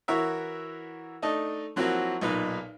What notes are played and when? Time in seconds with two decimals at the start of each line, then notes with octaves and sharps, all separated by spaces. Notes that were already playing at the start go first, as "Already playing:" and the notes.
0.08 E3 F#4 A#4 C#5 E5
1.22 A3 D4 D#4 D#5 A5
1.76 F3 F#3 A#3 C4 E4 F#4
2.21 B1 A#2 D#4 B4